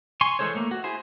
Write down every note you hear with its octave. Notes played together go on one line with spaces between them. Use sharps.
G#5 C6 C#6
E3 G#3 A4 C5 C#5
A3 A#3
F#4
E4 G#4 C5